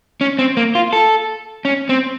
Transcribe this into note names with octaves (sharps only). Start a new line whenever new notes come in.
C#4
C4
A#3
F4
A4
C#4
C4